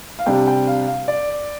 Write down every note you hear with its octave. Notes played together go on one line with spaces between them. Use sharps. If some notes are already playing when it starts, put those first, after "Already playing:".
F5
C3 G3 D4 G5
G5
F5
F5
D5